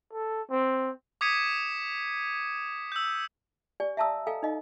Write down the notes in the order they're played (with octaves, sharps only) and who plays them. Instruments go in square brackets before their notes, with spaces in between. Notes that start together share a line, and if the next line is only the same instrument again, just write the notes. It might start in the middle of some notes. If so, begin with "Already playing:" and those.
[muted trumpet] A4
C4
[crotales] D6 D#6 G#6 B6 C#7 D#7
E6 G6
[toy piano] G4 D5 G#5
E5 F5 A5 A#5 D#6 E6
A4 D#5 F5 G#5 A#5
D#4 D#5 F5